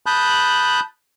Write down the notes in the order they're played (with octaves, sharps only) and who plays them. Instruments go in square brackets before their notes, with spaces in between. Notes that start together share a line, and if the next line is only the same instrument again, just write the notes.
[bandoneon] A5 B5 D#6 F#6 G6